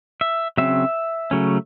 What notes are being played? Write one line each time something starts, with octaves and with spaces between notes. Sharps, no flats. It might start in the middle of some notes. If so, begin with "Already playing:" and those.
E5
C#3 F#3 C4 E5
C#3 F#3 A3 C#4